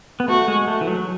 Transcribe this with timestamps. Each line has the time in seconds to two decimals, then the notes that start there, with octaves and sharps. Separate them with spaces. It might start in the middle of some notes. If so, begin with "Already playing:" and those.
0.20 B3
0.28 A3 F#4
0.48 G#3
0.67 A3
0.81 E3
0.87 F#3